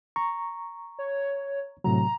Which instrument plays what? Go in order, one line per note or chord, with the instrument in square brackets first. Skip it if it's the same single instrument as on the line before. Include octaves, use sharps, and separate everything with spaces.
[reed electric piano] A#5 C#6
[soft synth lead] C#5
[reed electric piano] A2 C3 F#3 [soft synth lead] A#5